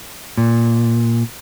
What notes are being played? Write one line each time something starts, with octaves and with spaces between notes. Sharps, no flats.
A#2